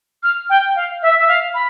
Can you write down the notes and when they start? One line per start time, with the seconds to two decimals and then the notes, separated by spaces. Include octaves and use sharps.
0.23 F6
0.50 G5
0.76 F5
1.02 E5
1.17 E5
1.28 F5
1.54 B5